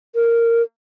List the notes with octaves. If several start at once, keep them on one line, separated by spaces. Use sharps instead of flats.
A#4